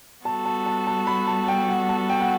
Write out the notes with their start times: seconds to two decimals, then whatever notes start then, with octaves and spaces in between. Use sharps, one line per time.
0.25 G3 B3 F#4 A4 A5
0.46 A5
0.66 A5
0.87 A5
1.07 B5
1.27 A5
1.48 G5
1.69 F#5
1.89 A5
2.09 G5
2.21 F#5